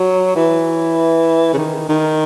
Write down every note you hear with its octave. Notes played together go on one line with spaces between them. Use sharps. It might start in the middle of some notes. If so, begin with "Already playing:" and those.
Already playing: F#3
E3
C#3
D#3
D#3